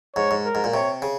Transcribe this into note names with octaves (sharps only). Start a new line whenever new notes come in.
G#2 C#5
G#2
A#4
G#2
A#2
C3 C#5
C#3